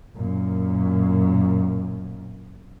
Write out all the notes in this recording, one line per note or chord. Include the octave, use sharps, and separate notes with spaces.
F#2 A#2